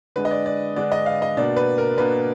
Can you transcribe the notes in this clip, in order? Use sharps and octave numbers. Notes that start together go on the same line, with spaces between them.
D3 G#3 D4 B4
D#5
D5
D5
D3 G#3 D4 D5
D#5
F5
D#5
B2 A#3 D4 D5
B4
A#4
B2 A#3 D4 B4